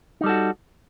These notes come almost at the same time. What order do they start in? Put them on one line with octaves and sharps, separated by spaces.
D#4 G3 A4 F#4